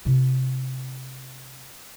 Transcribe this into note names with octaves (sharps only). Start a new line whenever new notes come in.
C3 E4